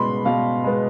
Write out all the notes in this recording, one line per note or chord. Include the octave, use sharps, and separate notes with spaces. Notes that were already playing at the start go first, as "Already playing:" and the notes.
Already playing: B2 G#3 B3 B5 C6
B2 F5
G#3 B3